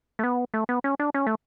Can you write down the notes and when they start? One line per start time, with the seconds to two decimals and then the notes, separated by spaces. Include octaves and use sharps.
0.19 A3
0.24 B3
0.54 A3
0.69 B3
0.84 C#4
0.99 D4
1.14 C#4
1.27 A3